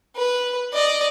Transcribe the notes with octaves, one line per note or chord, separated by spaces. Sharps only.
B4
D5 D#5